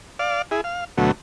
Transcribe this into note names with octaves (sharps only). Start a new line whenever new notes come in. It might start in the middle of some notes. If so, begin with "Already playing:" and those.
D5 F5
E4 G#4
F5
D2 B2 F#3 A3